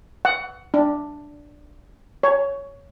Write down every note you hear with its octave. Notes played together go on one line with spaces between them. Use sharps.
F#5
D4
C#5